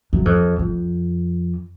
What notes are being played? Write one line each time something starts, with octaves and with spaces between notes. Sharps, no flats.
F#2
F2
F2